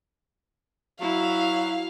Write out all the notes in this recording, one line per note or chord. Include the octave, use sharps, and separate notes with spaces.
F#3 E4 F5